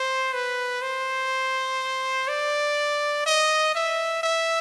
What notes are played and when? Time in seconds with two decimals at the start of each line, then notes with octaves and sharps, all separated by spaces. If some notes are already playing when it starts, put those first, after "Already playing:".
Already playing: C5
0.34 B4
0.82 C5
2.28 D5
3.26 D#5
3.75 E5
4.23 E5